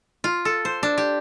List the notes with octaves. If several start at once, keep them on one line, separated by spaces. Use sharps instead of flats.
F4
A4
C5
D4
G4